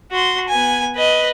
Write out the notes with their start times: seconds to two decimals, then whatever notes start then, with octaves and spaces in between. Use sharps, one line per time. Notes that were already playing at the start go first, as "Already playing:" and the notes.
0.11 F#4 C6
0.48 B3 G#5
0.96 B4 D#5